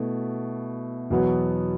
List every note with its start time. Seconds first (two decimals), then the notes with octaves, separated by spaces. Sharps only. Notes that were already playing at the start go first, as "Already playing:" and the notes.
Already playing: B2 A3 E4
1.10 E2 B2 F#3 B3